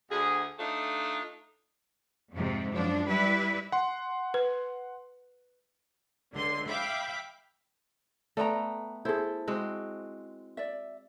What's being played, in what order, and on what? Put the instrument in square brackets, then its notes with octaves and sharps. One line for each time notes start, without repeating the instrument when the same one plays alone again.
[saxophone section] D2 G#4
A3 D4 D#4 F4
[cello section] F2 G#2 C3 F3
F#2 F3 D4
G3 E4 B4
[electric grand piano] F#5 C6
[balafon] B4
[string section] C#2 D3 C6
E5 F5 G5 B5 D6
[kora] A3 B3 G5 [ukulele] D5 A#5
[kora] E4 [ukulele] G#4 A4 C5
[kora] G#3 C4 F#4
[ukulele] D5 E5